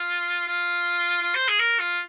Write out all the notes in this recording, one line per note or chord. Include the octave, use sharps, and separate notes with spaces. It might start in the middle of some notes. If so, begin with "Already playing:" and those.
Already playing: F4
F4
F4
C5
G#4
A#4
F4